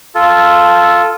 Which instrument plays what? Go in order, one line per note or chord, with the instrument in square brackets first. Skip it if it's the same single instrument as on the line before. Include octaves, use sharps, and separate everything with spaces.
[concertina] F4 A4